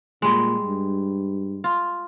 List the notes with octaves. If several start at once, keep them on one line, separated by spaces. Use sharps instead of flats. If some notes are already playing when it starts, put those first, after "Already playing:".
A#2 G3 G#3
G2
F4